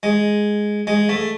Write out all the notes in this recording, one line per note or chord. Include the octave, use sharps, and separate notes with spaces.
G#3
G#3
A3